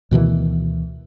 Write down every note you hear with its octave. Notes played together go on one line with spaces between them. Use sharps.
D2 B2 D#3 E3